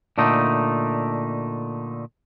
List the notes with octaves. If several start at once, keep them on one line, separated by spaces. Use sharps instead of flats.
A#2 D3 A3 D#4